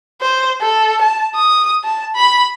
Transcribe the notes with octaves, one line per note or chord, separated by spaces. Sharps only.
C5
A4
A5
D#6
A5
B5